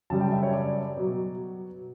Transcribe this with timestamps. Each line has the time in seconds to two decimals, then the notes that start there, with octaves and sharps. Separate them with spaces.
0.10 F#2 C#3 G3 A5
0.20 G5
0.32 E5
0.43 C#5
0.53 D5
0.97 B2 F#3